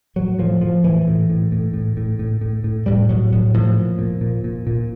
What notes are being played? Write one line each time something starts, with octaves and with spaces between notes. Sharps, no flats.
A2 F#3
A2 F3
A2 F3
A2 E3
A2
A2
A2
A2
A2
A2
A2
A2
A2 G3
A2 F#3
A2 F#3
A2 F3
A#2
A#2
A#2
A#2
A#2